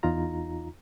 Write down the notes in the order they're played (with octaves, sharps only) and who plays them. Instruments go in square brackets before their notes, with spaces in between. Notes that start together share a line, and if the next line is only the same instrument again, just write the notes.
[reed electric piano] E2 D#4 F4 A#5